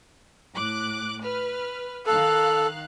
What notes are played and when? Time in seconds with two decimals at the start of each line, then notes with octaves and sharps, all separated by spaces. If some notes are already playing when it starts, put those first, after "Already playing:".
0.53 A2 D6 F#6
1.22 B4 F6
2.06 D#3 A4 F5 F#6